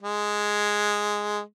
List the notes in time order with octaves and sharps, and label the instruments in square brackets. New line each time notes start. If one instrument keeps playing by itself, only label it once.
[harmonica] G#3